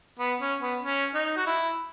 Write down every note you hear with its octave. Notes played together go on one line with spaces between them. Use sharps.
B3
C#4
B3
C#4
D#4
F#4
E4